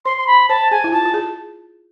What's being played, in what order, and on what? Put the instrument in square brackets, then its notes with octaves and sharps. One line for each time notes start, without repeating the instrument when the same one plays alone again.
[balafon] C5 [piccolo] C6
[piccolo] C6
B5
[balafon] C5 [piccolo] A5
[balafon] G#4 [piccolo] G#5
[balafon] E4
[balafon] F4 [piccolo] A5
[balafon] F4
G#4